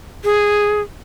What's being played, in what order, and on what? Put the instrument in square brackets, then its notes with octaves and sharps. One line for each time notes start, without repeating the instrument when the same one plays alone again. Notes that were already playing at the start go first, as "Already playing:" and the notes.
[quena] G#4